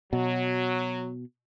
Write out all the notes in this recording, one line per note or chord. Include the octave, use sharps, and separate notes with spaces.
B2 F#3